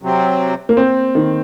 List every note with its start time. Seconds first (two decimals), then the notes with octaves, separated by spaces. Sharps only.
0.02 C3 F#3 C4
0.69 A#3
0.77 C4
1.15 D#3